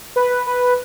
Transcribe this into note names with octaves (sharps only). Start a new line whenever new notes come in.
B4
B4